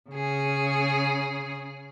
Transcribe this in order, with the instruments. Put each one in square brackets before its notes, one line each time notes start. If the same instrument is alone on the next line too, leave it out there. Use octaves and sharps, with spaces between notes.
[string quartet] C#3 G#4